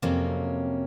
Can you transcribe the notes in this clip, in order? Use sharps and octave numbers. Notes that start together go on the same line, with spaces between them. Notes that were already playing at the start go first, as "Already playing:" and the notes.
F2 C3 F#3 A#3 C#4